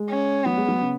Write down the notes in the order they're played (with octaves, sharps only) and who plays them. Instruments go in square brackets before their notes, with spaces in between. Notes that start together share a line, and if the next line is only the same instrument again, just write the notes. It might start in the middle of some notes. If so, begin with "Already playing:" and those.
Already playing: [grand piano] G#3
[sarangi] C#4
[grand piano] F#3 [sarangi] B3
[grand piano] G#3
F#3
C#3